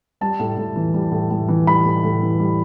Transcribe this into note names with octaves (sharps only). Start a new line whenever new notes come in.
G3 A5
A2
A2
E3
G3
A2
A2
E3
G3 B5
A2
A2
E3
G3